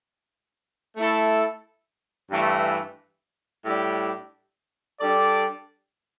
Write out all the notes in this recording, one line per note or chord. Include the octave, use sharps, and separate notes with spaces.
A3 E4 A4
G2 E3 A3
A2 G3 D4 G4
G3 D4 A4 D5